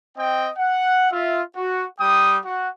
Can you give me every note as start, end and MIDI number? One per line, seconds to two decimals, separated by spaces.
0.17 0.49 60
0.17 0.49 75
0.17 0.49 79
0.57 1.07 78
1.10 1.40 65
1.10 1.40 76
1.56 1.85 66
1.99 2.37 55
1.99 2.37 79
1.99 2.37 87
2.44 2.68 66
2.44 2.68 78